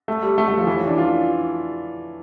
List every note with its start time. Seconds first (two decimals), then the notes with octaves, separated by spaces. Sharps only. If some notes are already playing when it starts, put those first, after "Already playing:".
0.08 A3
0.22 G3
0.38 A3
0.48 A3
0.57 F3
0.67 E3
0.77 C#4
0.87 D4
0.98 F4